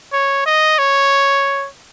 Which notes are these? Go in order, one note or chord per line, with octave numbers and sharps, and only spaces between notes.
C#5
D#5
C#5